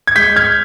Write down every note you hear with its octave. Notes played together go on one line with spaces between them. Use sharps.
G#6
G#3 G6 B6
F6 G#6